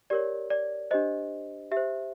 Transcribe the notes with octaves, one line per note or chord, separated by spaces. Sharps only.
G4 A#4 C#5 D5
D5
D4 G4 C5 D#5
G4 E5
C5